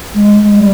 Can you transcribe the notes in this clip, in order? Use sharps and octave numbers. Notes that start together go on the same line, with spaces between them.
G#3
G#3
G3